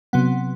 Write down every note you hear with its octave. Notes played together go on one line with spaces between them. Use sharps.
C3 F#3 B3 F#5